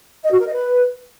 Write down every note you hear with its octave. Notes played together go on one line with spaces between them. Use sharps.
D#5
F#4
A#4
D#5
B4